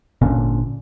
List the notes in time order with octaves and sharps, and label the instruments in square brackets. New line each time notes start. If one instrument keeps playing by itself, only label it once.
[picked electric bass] G#1 A#2 D3 C#4